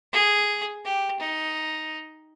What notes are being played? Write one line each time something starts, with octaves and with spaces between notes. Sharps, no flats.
G#4
G4
D#4